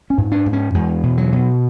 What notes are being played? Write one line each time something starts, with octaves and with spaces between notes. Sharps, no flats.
C#4
G#2
D4
G#2
C#4
E2 G#3
B2
F#3
B2